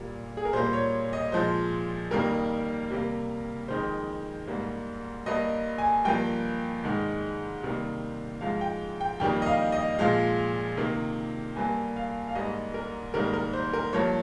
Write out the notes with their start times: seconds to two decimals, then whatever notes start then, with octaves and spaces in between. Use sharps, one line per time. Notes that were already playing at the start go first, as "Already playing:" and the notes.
Already playing: A#2 G3 A#3
0.37 G#4
0.45 A#4
0.53 A#2 G3 A#3 C5
0.73 C#5
1.13 D#5
1.32 A#2 F3 G#3 C5
2.11 F2 D#3 G3 A#3 A#4
2.90 C3 G3 A#3
3.68 F2 D#3 G#3 C5
4.48 G#2 G3 A#3
5.26 G2 G3 A#3 D#5
5.78 G#5
6.05 G2 F3 A#3 G5
6.84 G#2 D#3 G#3
7.62 C3 D#3 G3 A#3
8.41 G#2 F3 G#3 F5
8.61 G5
9.01 G5
9.20 F2 D#3 G3 A#3 G5
9.42 D#5
9.46 F5
9.72 D#5
9.99 A#2 F3 G#3 F5
10.77 C3 D#3 A#3
11.56 G2 G3 A#3 G#5
11.96 F5
12.28 F5
12.35 G#2 G3 A#3 D#5
12.74 A#4
13.14 G#2 D#3 G3 A#3 A#4
13.33 A#4
13.53 C5
13.73 A#4
13.93 G2 F3 A#3 C#5